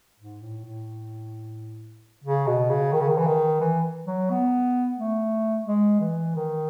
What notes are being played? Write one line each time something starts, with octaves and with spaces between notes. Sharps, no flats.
G#2
A2
A2
C#3
B2
C#3
D#3
C#3
D#3
E3
D#3
E3
F#3
B3
A3
G#3
E3
D#3